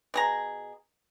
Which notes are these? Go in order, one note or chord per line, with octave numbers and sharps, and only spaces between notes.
B2 G#4 A#5